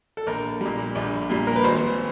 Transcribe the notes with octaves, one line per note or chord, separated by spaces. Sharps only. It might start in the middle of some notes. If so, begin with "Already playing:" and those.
A4
A#1 A#4
A#2 G3
A#1
A#2 G3
A#4
B4
G#1 C5